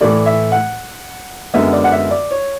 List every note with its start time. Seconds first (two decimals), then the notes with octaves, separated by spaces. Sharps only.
0.01 A2 E3 A3 D5
0.26 E5
0.52 F#5
1.54 F#2 D3 G#3 B3 E5
1.73 D5
1.84 F#5
1.92 E5
2.11 D5
2.31 C#5